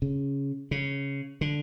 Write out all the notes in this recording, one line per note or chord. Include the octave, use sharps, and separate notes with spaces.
C#3
C#3
D3